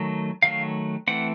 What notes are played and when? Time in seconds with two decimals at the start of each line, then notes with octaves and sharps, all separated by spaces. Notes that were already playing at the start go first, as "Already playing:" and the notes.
Already playing: D#3 F#3 A3
0.43 D#3 F#3 A3 F5
1.07 E3 A3 C4 F#5